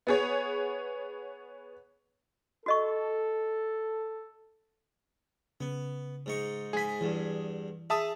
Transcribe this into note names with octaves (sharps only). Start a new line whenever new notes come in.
B3 G#4 C#5
F#4 A4 D#5 C#6
C#3 B3
G#2 D#4 C#6
G#2 G#4 G#5 B6
E2 G2 E3
G#4 E5 A5 D#6